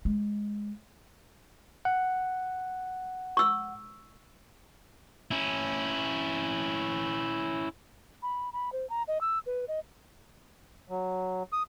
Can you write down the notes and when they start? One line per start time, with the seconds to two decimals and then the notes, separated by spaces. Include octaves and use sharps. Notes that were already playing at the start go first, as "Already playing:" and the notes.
0.05 G#3
1.85 F#5
3.37 C#6 E6
5.31 C#4 E4
8.22 B5
8.53 B5
8.72 C5
8.90 A#5
9.08 D#5
9.21 E6
9.46 B4
9.68 D#5
10.90 F#3
11.53 D#6